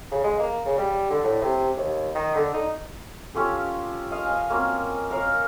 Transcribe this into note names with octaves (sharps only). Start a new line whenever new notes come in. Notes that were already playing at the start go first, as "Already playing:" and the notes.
C#3
G#3
A#3
C#3
G3
D3
A2
C3
D#2
D#3
D3
D#4
C#4 F4 G4 A4
D#5 F5
D#5 G#5
A#3 C4 C#4 F#4
A#4 C#5 F5